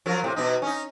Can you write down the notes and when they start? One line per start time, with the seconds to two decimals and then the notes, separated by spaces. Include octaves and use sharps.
0.06 F3 F#3 A#4
0.24 A2 C3
0.36 B2 D#4
0.62 C#4 D#4